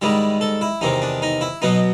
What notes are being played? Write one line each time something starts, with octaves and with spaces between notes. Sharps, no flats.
G#2 D#3 G3 E4
A4
E4
E2 C3 D#3 D#4
D4
D#4
E4
B2 F#3 B3 D#4